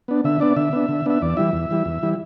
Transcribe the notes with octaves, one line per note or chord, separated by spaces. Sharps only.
B3 D4
D3 E5
B3 D4 D5
D3 E5
B3 D4
D3
B3 D4 E5
E2 D5
E3 G3 E4 E5
E2
E3 G3 E4
E2
E3 G3 E4